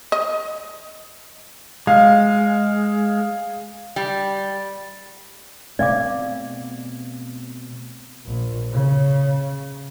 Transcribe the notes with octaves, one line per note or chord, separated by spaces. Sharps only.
D#5
G#3 F5
G3
B2 A3 C4 D5 F5 D6
A#1
C#3